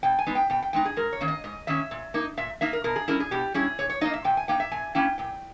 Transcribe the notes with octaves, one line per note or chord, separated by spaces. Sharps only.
B2 G5
G#5
G#3 B3 D#4
G5
B2 G5
G5
G#3 B3 D#4 G5
G#4
G#2 A#4
C#5
D#3 A#3 C#4
D#5
G#2 D#5
D#3 A#3 C#4 E5
A#2
A#3 D#4
A#2 E5
A#3 D#4 E5
A#4
B2 A#4
G#4
G3 C#4 E4 A#4
G#4
B2 G4
G3 C#4 E4 G#4
A#2 C#5
C#5
A#3 D#4 D#5
E5
A#2 G5
G#5
A#3 D#4 G5
E5
A#2 G#5
A#3 C#4 E4 G5
A#2 G5